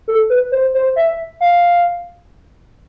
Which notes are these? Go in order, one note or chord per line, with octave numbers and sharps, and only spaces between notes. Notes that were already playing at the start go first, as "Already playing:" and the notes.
A4
B4
C5
C5
E5
F5